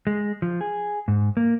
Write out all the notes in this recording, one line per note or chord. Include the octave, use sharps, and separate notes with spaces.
G#3
F3
G#4
G#2
A#3